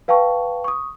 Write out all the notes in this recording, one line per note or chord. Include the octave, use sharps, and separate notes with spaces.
B4 F5 G5 A5 C#6
C#6 D#6